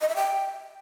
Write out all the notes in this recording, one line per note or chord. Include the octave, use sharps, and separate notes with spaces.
D#5
E5
G5